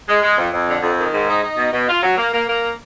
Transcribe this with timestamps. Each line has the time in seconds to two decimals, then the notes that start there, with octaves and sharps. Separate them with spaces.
0.08 G#3
0.22 G#3
0.38 F2
0.53 F2
0.68 D3
0.83 F2
0.97 D#3
1.12 G#2
1.28 D#4
1.43 D#4
1.58 B2
1.73 B2
1.88 F4
2.03 F#3
2.18 A#3
2.33 A#3
2.48 A#3